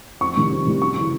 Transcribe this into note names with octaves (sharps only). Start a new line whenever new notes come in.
F2 C#6
C3 D#3 G3
F2
C3 D#3 G3
F#2 C#6
C#3 E3